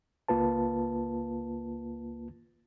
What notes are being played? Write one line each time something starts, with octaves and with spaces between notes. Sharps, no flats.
C#2 A#3 F4 B4 A5